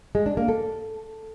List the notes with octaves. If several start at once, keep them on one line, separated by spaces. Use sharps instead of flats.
G#3
D4
A#3
A4